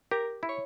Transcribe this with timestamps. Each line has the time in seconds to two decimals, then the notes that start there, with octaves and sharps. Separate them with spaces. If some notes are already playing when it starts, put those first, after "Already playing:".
0.11 G4 A#4
0.43 E4
0.49 C#5